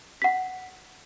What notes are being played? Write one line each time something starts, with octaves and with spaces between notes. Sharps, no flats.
F#5 B6